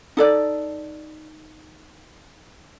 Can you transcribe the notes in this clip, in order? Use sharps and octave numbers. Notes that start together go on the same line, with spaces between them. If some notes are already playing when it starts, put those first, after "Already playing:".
D#4 A4 D5